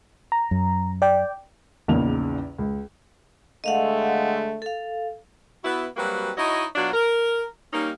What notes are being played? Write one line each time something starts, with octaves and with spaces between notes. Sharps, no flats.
A#5
F#2
D5 G5
A#1 E2 C#3 A#3 D#4 F7
C#2
D3 G#3 A3 D#5 F5 F#5
A4 F5
B3 E4 F#4
F#3 G3 A#3 C4 F#4 B4
D#4 E4 F#4 C#5 D#5
B2 F#3 D4 F4 F#4
A#4
G3 A#3 C#4 D#4